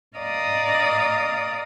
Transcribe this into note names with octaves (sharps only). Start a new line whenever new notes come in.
D5 D#5 F5 A#5 D#6